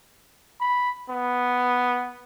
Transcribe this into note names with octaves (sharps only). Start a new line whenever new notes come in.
B5
B3